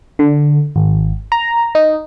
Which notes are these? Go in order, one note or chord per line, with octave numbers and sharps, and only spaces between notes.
D3
G#1
A#5
D#4